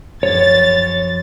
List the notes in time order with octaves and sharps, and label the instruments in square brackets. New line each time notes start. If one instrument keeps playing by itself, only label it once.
[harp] F#2 F3 [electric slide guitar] C#5 [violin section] A6